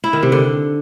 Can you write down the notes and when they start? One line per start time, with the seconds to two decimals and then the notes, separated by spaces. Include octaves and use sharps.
0.04 E4
0.13 D#3
0.23 C3
0.32 D3